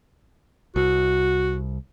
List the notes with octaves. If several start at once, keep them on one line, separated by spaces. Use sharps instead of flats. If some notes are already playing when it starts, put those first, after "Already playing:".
C2 F#4